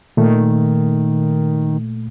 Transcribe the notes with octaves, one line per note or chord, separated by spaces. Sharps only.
A#2 D#3 A3